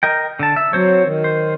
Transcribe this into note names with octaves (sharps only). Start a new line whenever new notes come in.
A#4 D#5 G5
D3 A5
E5
F#3 C4 C5 C#5
D#3
C5